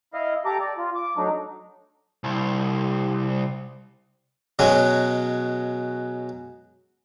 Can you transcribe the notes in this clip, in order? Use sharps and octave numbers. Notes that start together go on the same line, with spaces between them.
E4 D#5 F5
G4 A4 A#5 D6
D5
F4
D6
F#3 A3 D4 D#4
C2
B2 F#3 G#3 C#4